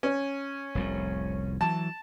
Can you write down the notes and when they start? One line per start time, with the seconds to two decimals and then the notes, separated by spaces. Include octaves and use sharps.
0.03 C#4
0.75 F1 C2 A2
1.61 E3 F#3 A5